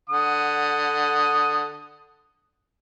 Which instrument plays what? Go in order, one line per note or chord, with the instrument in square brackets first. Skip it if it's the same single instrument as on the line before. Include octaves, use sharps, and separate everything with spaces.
[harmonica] D3 F#5 D#6